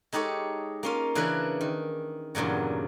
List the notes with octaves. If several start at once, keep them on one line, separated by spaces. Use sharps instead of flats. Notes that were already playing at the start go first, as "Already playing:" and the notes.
G#3 D#4 G4 A4 C#5
A#3 C#4 F4
C#3 E3 D4 E4 A#4 B4
D#3
E2 G2 A#2 C#3 F#3